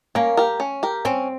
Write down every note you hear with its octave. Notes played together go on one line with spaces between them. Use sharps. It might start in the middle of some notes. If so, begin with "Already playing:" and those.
A#3 C#4
G4 A#4
C#4
G4 A#4
C4 C#4